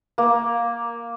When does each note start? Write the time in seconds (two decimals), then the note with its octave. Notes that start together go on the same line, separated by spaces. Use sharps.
0.18 A#3